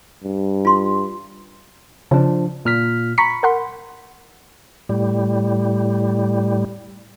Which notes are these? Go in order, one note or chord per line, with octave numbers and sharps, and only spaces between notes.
G2
F4 C6
C#3 F3 D4
A#2 F6 B6
A#5 B5 C#6 B6 C#7
A#4 F#5 C6
A2 G3